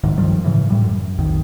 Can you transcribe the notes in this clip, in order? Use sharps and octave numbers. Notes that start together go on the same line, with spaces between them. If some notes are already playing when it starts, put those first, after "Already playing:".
D1 C#2 G#2 D#3
G2 D#3 F3 G3
A2 C#3 E3
A2 G3
F#2
B1 F2 D#3